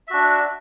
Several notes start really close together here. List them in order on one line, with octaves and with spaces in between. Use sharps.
E5 F#4 D4